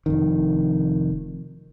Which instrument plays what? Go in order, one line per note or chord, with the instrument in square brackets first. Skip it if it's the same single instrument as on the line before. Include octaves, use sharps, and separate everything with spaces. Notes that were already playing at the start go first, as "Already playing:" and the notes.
[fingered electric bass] F1 F2 D#3